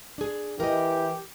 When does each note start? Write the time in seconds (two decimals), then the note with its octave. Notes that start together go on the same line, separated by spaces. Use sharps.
0.18 D4 G#4
0.60 E3 G4 A#4 D#5